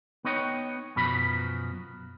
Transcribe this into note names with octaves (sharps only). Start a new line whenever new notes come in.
B3 D#4 C#5 D#5 G5
F#2 B2 F3 B5